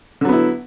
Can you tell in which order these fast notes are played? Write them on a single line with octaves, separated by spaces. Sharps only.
D3 F#3 B3 E4